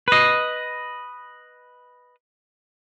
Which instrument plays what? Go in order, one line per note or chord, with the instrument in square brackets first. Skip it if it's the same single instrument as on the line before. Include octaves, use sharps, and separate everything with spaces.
[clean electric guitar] B4 D#5